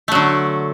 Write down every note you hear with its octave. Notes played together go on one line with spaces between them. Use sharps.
D3 F#3 A3